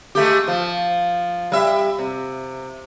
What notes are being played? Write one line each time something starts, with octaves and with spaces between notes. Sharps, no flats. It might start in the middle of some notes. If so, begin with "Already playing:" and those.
G#3 A3 G4
F3
G3 E5
C3